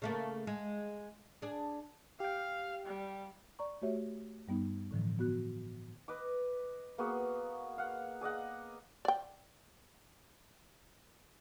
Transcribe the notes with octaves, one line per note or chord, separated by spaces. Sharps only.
C#3 A3 A#3
G#3
D4 G#4
G4 F5 G5
G3
D5 A#5 C#6
A3 F#4 G4 C#5 E5
G2 G3 B3 D#4
A2 D3 E3 F3
B3 F#4 F#6
B4 D#5 D6
A#3 B3 F#4 G#4
F5 F#5
G#4 D5 D#5 F#5
D5 G5